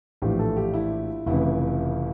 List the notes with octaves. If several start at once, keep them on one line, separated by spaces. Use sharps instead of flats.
A#1 A2 E3 G4
A4
G4
E4
F1 F2 C#3 E3 E4